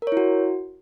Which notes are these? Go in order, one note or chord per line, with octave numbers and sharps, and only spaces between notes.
E4 F#4 A#4 C#5